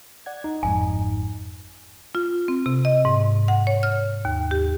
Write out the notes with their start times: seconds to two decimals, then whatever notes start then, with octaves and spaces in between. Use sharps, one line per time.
0.26 D5 F#5 G#6
0.44 D#4
0.63 G1 F2 G#2 G#5
2.15 F4
2.48 C4
2.66 C3
2.85 D#5
3.05 G#2
3.48 F#5
3.67 C#5
3.83 F6
4.25 D#2
4.51 G4